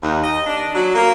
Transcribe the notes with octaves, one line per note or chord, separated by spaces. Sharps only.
D#2
D#5
D4
F#3
A#3